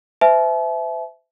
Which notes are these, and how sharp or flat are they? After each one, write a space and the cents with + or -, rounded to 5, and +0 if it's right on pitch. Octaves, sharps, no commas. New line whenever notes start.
C5 -40 E5 +0 A5 -45